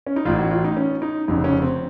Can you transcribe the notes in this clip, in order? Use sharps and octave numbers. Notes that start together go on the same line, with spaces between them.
C#4
D#4
A1 A2 F4
F#4
F4
D#4
C#4
D#4
F1 F2 C#3 D#4
C#4
C4